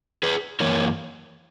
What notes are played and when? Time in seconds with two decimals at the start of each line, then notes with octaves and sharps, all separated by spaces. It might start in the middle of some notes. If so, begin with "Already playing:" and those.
0.23 G#4 B4
0.60 F#2 E3 A#3 E4 A#4 C#5